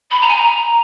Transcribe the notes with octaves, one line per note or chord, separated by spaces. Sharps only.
B5
A#5
G#5
A#5